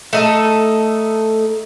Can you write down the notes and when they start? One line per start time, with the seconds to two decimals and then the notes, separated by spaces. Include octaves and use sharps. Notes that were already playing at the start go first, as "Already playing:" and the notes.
0.13 A3 D#4 A4